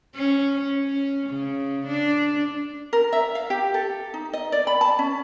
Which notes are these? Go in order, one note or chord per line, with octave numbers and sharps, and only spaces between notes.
C#4
C#4
C#3
D4
A#4
E5
F5
G4
A4
D#4
D#5
D5
B5
A5
C#4